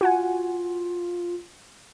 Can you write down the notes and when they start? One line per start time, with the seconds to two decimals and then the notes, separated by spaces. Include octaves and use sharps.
0.01 F4 F#4 F#5 G#5